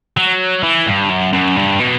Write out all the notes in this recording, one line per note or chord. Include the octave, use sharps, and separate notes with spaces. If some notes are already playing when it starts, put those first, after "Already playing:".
F#3
E3
G2
F#2
F#2
G2
B2